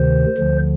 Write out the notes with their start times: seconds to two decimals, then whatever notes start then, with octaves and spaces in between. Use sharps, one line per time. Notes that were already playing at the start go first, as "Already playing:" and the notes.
Already playing: D2 C3 D#3 C5
0.38 D2 D3 F3